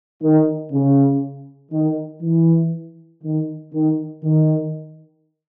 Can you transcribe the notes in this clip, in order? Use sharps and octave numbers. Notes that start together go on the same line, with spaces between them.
D#3
C#3
D#3
E3
D#3
D#3
D#3